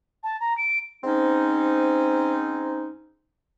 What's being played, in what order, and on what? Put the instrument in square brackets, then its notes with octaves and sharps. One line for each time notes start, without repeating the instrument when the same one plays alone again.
[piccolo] A5
A#5
D7
[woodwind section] G#2 C4 C#4 D#4